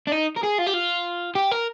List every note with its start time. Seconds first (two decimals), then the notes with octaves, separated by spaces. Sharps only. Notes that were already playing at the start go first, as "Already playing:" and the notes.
0.07 D4
0.12 D#4
0.36 A#4
0.43 G#4
0.58 F4
0.66 G4
0.73 F4
1.35 G4
1.52 A#4